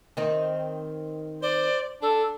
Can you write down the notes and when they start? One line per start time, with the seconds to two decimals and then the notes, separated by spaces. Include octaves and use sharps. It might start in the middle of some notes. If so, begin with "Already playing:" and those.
0.17 D#3 C4 D#4
1.42 C5 D5
2.02 D4 A4